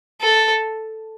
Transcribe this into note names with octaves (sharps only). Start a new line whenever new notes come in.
A4